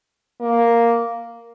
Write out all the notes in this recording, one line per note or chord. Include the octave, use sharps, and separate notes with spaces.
A#3